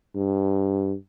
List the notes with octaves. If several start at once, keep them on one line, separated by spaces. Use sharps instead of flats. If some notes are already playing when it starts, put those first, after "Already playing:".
G2